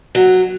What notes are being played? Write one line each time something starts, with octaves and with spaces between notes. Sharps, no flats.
F#3